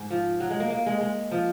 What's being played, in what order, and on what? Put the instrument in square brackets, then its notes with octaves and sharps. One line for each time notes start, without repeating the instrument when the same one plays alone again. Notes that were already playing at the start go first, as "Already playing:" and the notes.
Already playing: [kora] G#2
F3
F#3
G#3
A#3
A#3
G#3
G#3
F3